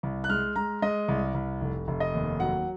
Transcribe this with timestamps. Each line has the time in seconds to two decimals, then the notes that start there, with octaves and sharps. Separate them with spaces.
0.03 C2
0.24 F#6
0.29 G#3 F6
0.56 G#3 A#5
0.82 G#3 D#5
1.08 C2
1.34 C2
1.61 F1
1.88 F1
2.00 D#5
2.14 D#2
2.40 F#3 F#5